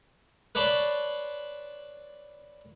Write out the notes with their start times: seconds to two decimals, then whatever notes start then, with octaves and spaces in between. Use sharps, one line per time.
0.55 B4 C#5 D5 A5 B5 C6